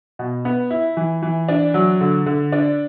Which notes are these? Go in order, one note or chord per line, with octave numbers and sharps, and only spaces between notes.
B2
B3
E4
E3
E3
D4
F#3
D3
D3
D4